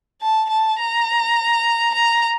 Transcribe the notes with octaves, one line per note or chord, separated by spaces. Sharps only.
A5
A5
A#5
A#5